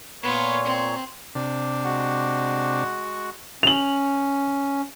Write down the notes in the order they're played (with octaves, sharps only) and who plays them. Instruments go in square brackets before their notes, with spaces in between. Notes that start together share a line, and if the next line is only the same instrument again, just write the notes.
[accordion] A#2 C#5 [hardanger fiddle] B3 F4
[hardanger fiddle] C4
[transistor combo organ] C3 D4
[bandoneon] G#3 F#4 F#5
[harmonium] C#4 [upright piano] F7 F#7